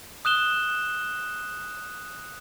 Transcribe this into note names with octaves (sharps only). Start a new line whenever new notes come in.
D#6 F#6 E7 G7